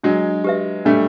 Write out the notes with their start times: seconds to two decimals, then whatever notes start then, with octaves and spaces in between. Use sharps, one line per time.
0.03 F#3 G#3 D4
0.44 G4 B4 E5
0.85 G3 A3 D4